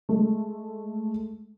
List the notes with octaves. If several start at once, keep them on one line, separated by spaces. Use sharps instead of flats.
G#3 A3